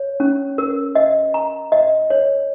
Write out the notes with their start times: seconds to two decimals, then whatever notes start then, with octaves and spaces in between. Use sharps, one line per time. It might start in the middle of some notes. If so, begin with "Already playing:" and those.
Already playing: C#5
0.20 C#4
0.58 A#4
0.95 D#5
1.34 A#5
1.72 D#5
2.10 C#5